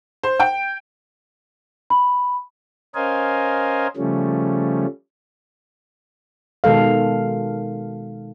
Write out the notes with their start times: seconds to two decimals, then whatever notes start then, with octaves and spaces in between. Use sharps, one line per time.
0.23 C5
0.40 G5
1.90 B5
2.95 C#4 A#4 C5 D#5 F5 G#5
3.97 C#3 F3 G3 A3 C#4
6.64 B2 D#3 G#3 A4 F5